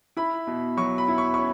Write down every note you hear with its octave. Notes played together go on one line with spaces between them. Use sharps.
E4 B5
B2
F#3 C#6
B5
E4
C#6
C#4 C#6